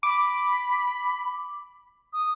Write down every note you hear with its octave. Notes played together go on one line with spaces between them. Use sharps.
B5 D6
D#6